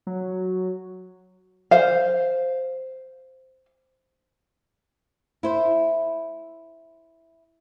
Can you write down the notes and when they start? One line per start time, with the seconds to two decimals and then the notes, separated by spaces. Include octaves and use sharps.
0.07 F#3
1.71 C5 F5
5.43 E4 C5